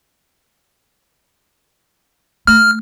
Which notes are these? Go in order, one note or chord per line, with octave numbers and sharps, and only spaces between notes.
A3 F6